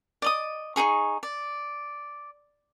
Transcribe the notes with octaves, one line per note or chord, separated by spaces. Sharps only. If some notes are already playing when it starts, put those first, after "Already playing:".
D5 D#5 D#6
D#4 E4 G#4 C#6
D5